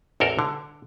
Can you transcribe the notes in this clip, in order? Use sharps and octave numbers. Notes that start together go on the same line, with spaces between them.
A1 E2 A4 A#4
D3